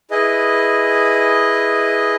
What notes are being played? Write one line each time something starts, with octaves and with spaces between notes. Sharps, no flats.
E4 G#4 B4 D#5